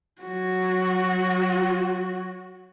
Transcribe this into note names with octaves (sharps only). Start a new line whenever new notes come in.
F#3 F#4